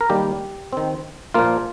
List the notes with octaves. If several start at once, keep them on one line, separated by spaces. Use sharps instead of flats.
A#4
D#3 G3 A#3 G4
D#3 C4
A#2 F3 A#3 F4